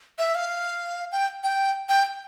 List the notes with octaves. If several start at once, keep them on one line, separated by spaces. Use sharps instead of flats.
E5
F5
G5
G5
G5